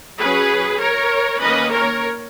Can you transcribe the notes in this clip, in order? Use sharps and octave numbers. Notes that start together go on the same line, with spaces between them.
F#3 C#4 G#4 B4
A#4 C#5
D#3 A#3 C#4 B4 D#5
A#4 C#5